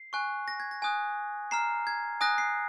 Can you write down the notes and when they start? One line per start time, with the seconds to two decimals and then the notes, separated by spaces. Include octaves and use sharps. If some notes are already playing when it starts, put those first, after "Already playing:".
Already playing: C7
0.13 G#5 C#6 F#6
0.48 A#6
0.60 G#6
0.71 A#6
0.82 G#5 D#6 F#6
1.51 A#5 F6 C7
1.87 G#6
2.21 G#5 D#6 F#6 A#6
2.38 C7